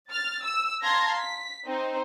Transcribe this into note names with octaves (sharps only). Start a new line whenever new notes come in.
F6 A6
E6
F5 A5 A#5 C6 G#6 A#6
B6
C4 D#4 C5